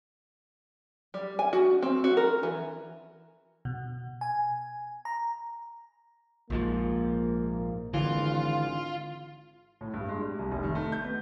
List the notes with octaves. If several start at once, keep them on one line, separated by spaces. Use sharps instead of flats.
G3
G#5
F#4
C4
F#4
A#4
E3
B2
G#5
A#5
A#1 G#2 F3 A#3
G#1 D3 E3 F4
A2
G2
G#3
G3
C2
F1
D#3
A3
G6
B3